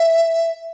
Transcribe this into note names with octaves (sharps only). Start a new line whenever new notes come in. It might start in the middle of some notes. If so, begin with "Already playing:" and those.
Already playing: E5